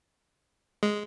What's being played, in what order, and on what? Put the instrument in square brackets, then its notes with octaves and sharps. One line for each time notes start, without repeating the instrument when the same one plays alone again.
[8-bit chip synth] G#3